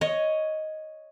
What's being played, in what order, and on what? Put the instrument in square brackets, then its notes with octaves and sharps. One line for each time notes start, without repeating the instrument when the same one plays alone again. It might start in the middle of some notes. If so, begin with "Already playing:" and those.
[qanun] C#5 D#5